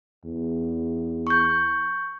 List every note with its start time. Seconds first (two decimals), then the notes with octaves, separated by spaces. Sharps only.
0.25 E2
1.27 C#6 G6